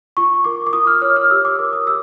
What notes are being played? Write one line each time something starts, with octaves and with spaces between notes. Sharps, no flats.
F4 C#6
A#4 D6
D6
F4 D#6
F6
C#5 F6
F6
G4 E6
D6
A#4 D6
D#6
G4 E6